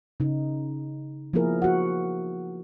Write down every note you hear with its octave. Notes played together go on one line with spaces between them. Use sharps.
C#3 D#4
F3 A#3 B3 E4 G#4 A#4
F#4 F#5